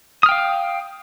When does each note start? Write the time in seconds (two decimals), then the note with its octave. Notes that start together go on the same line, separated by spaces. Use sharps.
0.23 D#6
0.26 F6
0.29 G5
0.31 F5